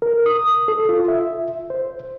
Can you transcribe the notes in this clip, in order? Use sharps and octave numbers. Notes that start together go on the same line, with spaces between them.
A#4
D#6
A4
F4
E5
C5